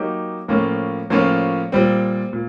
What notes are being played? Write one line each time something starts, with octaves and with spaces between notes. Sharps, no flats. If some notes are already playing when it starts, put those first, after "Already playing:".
Already playing: F#3 A#3 D#4 G4
A2 F3 A#3 C#4 F4
A2 F3 A#3 C#4 F4
A#2 G3 C4
A#2